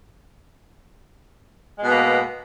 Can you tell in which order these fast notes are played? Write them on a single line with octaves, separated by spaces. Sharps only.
G#3 B2 B3 A#3